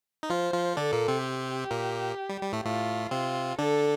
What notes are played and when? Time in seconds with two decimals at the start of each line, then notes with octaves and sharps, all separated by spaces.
0.23 D#4
0.30 F3 F4 C5
0.53 F3 F4
0.77 D3 D4 A4
0.93 A#2 A#3
1.08 C3 C4
1.24 G4
1.71 A#2 A#3
2.29 G3
2.41 G3
2.53 A2 A3
2.64 A2 A3 F4
3.11 C3 C4 F4
3.58 D3 D4 A4